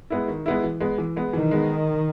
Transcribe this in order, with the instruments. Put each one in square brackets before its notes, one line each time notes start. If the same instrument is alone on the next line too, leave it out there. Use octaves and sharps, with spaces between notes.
[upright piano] G#3 B3 E4
D#3
G#3 B3 E4
E3
G#3 B3
E3
G#3 B3
[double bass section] D#3 [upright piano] E3
[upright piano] G#3 B3